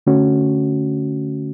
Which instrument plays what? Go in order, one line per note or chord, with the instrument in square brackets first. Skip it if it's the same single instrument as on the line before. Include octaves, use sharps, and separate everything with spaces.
[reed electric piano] D3 A3 C#4 F#4